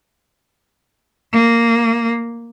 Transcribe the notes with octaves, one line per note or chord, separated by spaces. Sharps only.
A#3